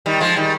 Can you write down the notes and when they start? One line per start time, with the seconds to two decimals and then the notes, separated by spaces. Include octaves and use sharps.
0.06 D#3 G3
0.20 F3 G#3
0.36 D#3 G3